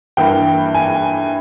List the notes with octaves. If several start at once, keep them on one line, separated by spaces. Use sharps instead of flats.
G2 E3 A#3 G5
G#5